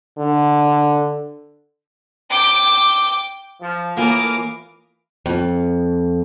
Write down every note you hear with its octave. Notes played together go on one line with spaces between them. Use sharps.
D3
G5 D6
F3
A2 E3 A#3 F4 A#4 G#5 D6 D#6
F2